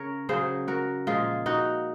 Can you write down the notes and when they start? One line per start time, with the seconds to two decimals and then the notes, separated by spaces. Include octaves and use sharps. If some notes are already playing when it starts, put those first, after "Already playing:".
Already playing: C#3 A#4 C#5
0.29 C#3 F#3 G#4 C5
0.68 F#4 A#4
1.07 A#2 F3 G#3 F4 G#4
1.46 D#4 F#4